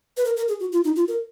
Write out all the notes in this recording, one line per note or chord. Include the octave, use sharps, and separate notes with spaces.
B4
A#4
A#4
G#4
F#4
F4
D#4
F4
A#4